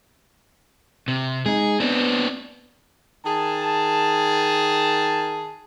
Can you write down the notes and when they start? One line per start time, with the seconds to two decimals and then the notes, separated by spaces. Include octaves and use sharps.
1.08 C3
1.46 G#3 D#4 G#4
1.80 B3 C4 D4
3.26 D#3 G#4 A5